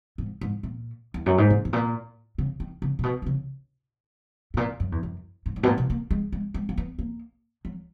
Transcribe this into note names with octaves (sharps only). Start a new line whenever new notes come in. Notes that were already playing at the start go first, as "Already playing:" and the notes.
G#2
G#2
A#2
E2
F#2
G#2
A#2
G#2
A#2
C#3
D#3
C#3
A#2
B2
D#3
C#3
G#2
A#2
F#2
E2
F#2
G#2
G#2
B2
A#2
B2
A#3
G#3
G#3
G#3
A#3
B3
A#3
F#3